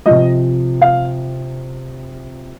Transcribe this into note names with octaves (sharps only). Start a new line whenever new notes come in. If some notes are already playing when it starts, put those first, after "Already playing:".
C3 F3 D#5
F5